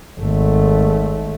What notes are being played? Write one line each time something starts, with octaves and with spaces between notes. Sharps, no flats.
G#1 A3